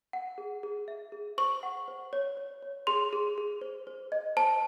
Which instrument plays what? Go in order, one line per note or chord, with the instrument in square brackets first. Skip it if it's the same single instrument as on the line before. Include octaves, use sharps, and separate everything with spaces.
[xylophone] F#5
G#4
G#4
E5
G#4
C5 C#6
F#5
C5
C#5
C#5
C#5
G#4 C6
G#4
G#4
C5
C5
D#5
C5 A5